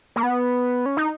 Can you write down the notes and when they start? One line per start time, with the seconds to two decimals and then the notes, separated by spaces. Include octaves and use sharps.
0.16 A#3
0.23 B3
0.86 C#4
0.97 D#4